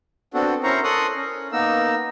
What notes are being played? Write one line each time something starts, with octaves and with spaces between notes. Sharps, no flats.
B3 C4 D4 F#4 A4
C#4 E4 A#4 C5 A#5 C#6
A4 A#4 C6 C#6 D#6 F#6
C#4
A#3 B3 D#4 A#4 E6